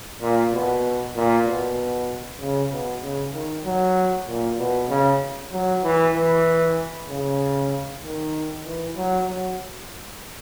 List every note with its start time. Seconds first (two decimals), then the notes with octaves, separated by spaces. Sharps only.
0.22 A#2
0.53 B2
1.15 A#2
1.47 B2
2.41 C#3
2.71 B2
3.03 C#3
3.34 D#3
3.65 F#3
4.28 A#2
4.59 B2
4.90 C#3
5.53 F#3
5.84 E3
6.15 E3
7.09 C#3
8.02 D#3
8.65 E3
8.96 F#3
9.27 F#3